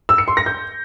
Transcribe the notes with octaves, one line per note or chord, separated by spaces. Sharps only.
E6
C#7
C6
A#6
G6